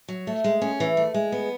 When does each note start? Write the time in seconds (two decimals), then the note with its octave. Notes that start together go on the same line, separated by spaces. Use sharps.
0.08 F#3
0.27 A3
0.44 G#3
0.62 C#4
0.80 E3
0.97 A3
1.14 G#3
1.32 B3